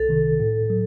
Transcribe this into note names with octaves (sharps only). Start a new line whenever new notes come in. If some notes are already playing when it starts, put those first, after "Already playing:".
Already playing: C2 A4
C3 D#3
A2
F#3